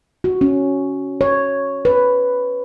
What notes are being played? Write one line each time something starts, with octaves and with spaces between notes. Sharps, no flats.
F#4
C#4
C#5
B4